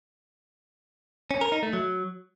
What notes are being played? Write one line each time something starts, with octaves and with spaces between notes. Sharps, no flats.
C#4
A#4
D#4
A3
F#3